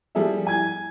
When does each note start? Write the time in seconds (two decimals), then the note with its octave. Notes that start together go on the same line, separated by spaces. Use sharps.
0.15 F3 G3 G#4 A4 E5
0.47 G#5 G#6